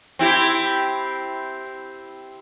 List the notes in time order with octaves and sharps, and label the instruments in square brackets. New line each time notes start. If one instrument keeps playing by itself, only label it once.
[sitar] C4 E4 G4